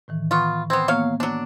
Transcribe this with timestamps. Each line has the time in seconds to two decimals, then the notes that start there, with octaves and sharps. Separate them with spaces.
0.08 A2 D#3 E3
0.31 B3 F4 C#6
0.70 B3 C4 G#6
0.88 F#3 A#3 B3 C#5 F5
1.20 F#3 D4